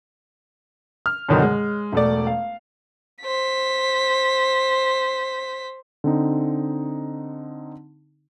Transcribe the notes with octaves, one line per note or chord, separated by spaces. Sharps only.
F6
F#2 B2 D3 D#3 F#3
G#3
E1 A3 D5
F5
C5 B6
D3 C4 D#4